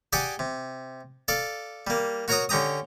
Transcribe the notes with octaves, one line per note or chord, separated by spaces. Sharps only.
G4 G#4 D5 F#5 G#5
C3
A4 D5 F5
G3 A#3
F#4 A#4 C#5 F#5 A#5 D#6
D3 C#4 G4 A#5 D#6